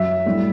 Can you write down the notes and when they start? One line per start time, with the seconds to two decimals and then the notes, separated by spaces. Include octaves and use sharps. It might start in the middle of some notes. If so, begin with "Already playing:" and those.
Already playing: F#2 F#3 E5
0.26 A2 G3